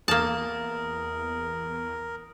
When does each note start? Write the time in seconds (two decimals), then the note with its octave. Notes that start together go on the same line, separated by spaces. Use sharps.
0.08 E2 A#3 A#4 A5 D#6